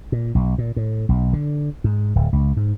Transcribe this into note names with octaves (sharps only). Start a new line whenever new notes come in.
A#2
B1
A#2
A2
B1
D3
G#2
D1
C#2
G#2